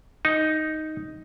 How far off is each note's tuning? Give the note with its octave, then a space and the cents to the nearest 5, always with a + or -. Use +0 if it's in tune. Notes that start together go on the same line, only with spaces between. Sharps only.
D#4 +0